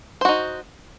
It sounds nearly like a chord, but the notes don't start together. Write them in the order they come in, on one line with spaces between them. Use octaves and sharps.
C5 F#4 D#4